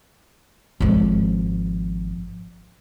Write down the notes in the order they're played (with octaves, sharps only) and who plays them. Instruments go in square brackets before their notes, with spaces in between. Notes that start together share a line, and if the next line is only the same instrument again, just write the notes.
[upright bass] G#1 F3